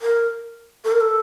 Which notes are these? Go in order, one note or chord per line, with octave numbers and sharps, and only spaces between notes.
A#4
A4
A#4
A4